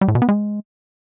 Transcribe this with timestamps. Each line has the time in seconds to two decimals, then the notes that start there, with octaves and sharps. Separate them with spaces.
0.01 G3
0.08 A2
0.15 B2
0.22 B3
0.29 G#3